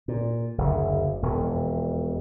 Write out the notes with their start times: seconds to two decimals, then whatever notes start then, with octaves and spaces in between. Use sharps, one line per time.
0.08 A#2
0.58 F#1 D2
1.23 E1 F2